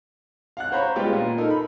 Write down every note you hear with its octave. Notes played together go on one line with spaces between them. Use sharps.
F5 F#5 F#6
C5 C#5 A#5 B5
G3 G#3 B3 F4 G4
A#2
D#4 A4 A#4
B5